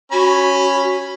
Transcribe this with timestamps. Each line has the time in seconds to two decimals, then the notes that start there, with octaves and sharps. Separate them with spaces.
0.12 C#4 F#4 B5